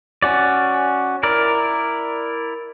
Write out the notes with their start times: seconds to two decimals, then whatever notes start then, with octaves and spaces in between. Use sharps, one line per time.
0.22 C#4 F#4 D5
1.23 E4 A#4 D5